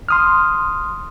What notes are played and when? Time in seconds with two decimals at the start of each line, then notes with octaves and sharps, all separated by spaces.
0.09 C6 D#6 F6